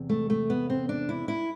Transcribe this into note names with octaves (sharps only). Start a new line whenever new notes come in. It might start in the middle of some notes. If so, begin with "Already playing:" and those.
Already playing: E2 C3
A3
A3
B3
C4
D4
E4
E4